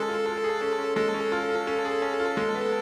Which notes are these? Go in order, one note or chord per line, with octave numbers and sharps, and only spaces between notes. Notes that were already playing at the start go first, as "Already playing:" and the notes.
Already playing: G#3 C#4 G#4 A4
F4
F4
G#4
C#4
C#4
G#3 A4
C#4
F4
F4
C#4
G#4
C#4
F4
G#3
B3